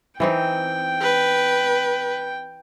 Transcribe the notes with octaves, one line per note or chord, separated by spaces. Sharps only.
E3 C4 D#4 G5
B4